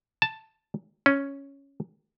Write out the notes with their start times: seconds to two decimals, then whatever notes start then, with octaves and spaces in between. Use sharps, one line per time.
0.22 A5
1.06 C#4